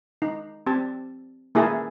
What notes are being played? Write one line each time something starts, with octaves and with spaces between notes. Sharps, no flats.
D#4
C4 G4 A5
A#3 E4 G#4 A#4 E5 A5